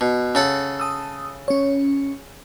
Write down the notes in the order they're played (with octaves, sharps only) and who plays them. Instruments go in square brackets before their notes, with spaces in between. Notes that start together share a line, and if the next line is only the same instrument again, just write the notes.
[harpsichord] B2
C#3 A4 F#5
[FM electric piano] A5 D#6 E6
C#4 C#5